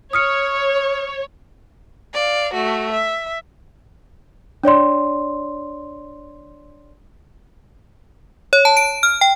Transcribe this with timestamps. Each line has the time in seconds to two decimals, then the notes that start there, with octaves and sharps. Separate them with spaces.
0.13 C#5 D#6 F6 C#7
2.14 D5 F5
2.53 A3 F#4
2.92 E5
4.64 D4 C#5 D5 C6
8.53 C#5
8.65 A5
8.77 D7
9.03 F6
9.21 G5